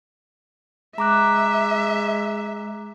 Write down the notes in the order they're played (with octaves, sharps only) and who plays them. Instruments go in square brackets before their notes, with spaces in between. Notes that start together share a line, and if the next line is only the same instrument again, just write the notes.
[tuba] G#3 [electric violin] E5 [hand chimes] A#5 D6 F#6